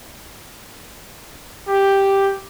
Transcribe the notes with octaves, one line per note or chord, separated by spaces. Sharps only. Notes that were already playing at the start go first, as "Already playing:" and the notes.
G4